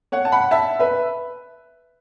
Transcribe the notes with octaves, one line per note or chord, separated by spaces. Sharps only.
C#5 F#5
A5
F#5 B5
E5 A5
B4 E5